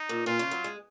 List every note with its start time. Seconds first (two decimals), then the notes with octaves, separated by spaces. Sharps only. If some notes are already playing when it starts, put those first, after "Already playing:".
Already playing: D#4
0.09 A#2
0.26 A#2 F4
0.39 C#3
0.51 F#3
0.64 G#3